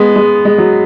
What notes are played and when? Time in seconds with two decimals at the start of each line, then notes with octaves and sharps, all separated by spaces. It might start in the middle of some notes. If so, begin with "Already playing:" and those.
Already playing: G#3 B3
0.16 G#3
0.45 G#3
0.58 F#3